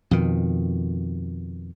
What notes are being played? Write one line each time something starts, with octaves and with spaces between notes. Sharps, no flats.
F2 B2 D#3